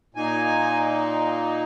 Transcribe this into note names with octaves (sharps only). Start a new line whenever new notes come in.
A#2 A#3 D#4 G#5